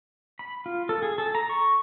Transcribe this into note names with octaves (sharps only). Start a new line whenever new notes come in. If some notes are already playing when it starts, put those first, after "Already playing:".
B5
F4
A4
G#4
A4
A#5
C#6